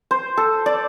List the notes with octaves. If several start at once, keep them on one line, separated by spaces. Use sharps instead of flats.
C5
A4
D5